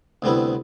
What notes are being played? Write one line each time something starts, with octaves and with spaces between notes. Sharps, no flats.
D2 C3 G3 B3 E4